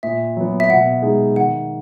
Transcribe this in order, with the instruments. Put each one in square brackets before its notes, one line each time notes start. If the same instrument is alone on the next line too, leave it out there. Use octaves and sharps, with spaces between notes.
[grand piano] A#2 [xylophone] E5
[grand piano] F#3 B3
[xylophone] E5
[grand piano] B2 [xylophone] F#5
[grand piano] G#3 D#4 G#4
[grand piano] D#3 [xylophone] F#5